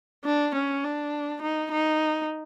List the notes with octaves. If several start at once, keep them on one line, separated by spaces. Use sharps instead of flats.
D4
C#4
D4
D#4
D#4